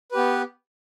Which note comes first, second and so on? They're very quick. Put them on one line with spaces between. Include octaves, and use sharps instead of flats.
B4 G4 B3